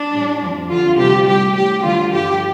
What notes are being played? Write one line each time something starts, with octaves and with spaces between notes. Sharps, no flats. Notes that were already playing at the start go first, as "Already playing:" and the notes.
Already playing: D4
A2 G3
F2 F3
F2 D3 G3 F4
D2 C3 G3 G4
A2 G3 G4
A2 G3 G4
D2 D3 G3 F4
G2 D3 F3 G4